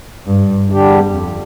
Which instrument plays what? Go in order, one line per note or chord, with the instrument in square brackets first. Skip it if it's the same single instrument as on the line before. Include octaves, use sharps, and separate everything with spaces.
[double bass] G2
[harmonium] E2 D3 G3 D4 G4
[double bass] F2